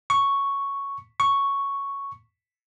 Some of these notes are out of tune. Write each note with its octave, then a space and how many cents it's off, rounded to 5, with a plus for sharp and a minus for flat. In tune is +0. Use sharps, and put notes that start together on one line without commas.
C#6 +0
C#6 +0